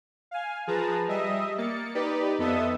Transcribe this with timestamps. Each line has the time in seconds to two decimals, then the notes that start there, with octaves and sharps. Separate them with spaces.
0.31 F5 G#5
0.67 F3 G#4 B4 A5 A#5
1.08 G3 D#5 E5 D#6
1.58 A#3 A6 C#7
1.95 D#4 G4 B4 D5
2.38 F2 B3 A4 D#5 E5 D#6